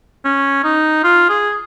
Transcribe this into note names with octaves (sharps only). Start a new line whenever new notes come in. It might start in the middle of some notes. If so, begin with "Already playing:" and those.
C#4
D#4
F4
G#4